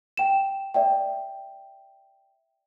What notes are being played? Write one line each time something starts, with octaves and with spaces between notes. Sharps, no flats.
G5 E7
D5 E5 G5